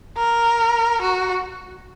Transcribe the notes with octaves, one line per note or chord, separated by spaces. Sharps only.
A#4
F#4